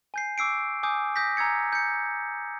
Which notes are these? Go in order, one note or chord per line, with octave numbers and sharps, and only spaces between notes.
G#5 G6 C7
C#6 D6 E6 C7 D7
G#5 D6 D#6 G6
D#6 G6 A#6 B6
G#5 A#5 E6 G#6 C#7
G6 C#7